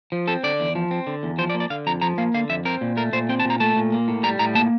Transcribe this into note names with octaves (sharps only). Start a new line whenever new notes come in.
F3
C4 A4
D3 D5
E2
F3
C4
D3
E2
F3 C5
D5
A#3
D5
D3 F5
F2 A#5
F3 A#5
A#3 F5
D3 F5
F2 E5
C4 A#4
A#2
A3 A#4
A#2 C5
C4 G5
A5
A#2
A#5
A3 A5
A#2
A#3
A2
G3 A#5
A2 A#5
A#3 A5